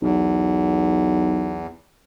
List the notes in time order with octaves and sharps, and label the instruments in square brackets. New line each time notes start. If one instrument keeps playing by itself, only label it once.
[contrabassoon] B1 [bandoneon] E2